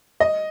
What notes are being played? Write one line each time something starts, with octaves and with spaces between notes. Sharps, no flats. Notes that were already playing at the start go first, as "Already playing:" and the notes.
D#5